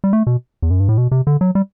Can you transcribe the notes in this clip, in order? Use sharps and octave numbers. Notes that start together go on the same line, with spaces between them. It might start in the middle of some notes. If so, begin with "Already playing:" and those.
G3
A3
B2
E2
F#2
G2
A2
B2
C3
D3
F#3
G3